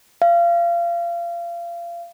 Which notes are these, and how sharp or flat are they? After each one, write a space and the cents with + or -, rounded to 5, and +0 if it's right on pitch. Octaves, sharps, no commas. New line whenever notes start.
F5 -30